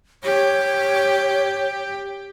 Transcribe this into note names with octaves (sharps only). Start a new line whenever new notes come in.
G4 C#5